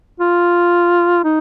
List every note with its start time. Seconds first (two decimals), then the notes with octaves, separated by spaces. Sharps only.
0.20 F4
1.24 D#4